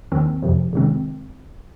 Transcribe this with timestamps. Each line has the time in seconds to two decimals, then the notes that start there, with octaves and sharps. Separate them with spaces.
0.12 D#2 D#3 C4
0.42 F2 C3 F3
0.73 C3 D#3 G#3 C4